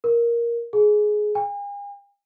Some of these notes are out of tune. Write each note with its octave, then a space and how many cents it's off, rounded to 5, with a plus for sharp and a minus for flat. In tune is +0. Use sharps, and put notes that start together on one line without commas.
A#4 +10
G#4 +15
G#5 -45